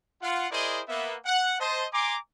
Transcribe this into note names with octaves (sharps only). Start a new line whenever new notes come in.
F4 F#5
E4 G#4 A#4 C5 D5 D#5
A#3 B3 E5
F#5
C5 D#5 A5
G#5 A#5 C6 D6